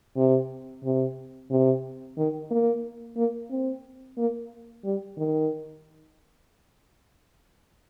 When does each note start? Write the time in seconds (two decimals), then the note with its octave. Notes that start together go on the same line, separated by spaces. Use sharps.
0.17 C3
0.84 C3
1.51 C3
2.17 D#3
2.51 A#3
3.17 A#3
3.51 C4
4.18 A#3
4.85 G3
5.18 D#3